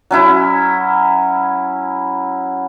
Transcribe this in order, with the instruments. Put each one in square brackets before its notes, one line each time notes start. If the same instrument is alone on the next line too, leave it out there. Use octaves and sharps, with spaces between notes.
[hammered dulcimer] F#3 C#4 E4